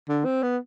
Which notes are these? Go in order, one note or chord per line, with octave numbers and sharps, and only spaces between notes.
D3
C4
B3